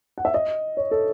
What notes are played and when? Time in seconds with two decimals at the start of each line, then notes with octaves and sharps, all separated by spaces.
0.18 F#5
0.25 E5
0.34 D#5
0.77 C#5
0.91 A4